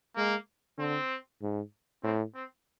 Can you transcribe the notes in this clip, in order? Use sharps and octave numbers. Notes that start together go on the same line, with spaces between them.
G#3 A#3
D3 C4
G#2
A2 C4
C4